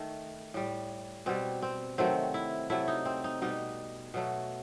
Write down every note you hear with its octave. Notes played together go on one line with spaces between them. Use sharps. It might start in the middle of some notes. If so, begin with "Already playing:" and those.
Already playing: D#3 A3
A2 G3
B2 G3 C4
C4
C3 D#3 F#3 A3 C4
E4
C3 F#3 A3 E4
D#4
C4
D#4
B2 G3 D#4
B2 F#3 A3